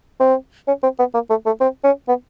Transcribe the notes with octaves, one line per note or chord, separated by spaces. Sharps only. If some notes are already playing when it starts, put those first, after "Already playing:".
C4
C#4
C4
B3
A#3
A3
A3
C4
C#4
B3